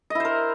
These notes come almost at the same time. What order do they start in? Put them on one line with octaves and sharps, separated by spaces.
D#5 E4 C5 A#4